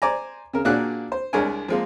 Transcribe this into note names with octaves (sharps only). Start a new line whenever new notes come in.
C5 D5 G#5 A#5
C#3 A#4
A#2 A#3 D4 F#4 G#4 F#6
C5
C2 G#3 D4 A#4 C#5 G#5
F3 G#3 A#3